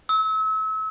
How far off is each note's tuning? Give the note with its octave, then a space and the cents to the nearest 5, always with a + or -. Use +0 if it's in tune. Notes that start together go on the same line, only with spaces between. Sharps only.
E6 -35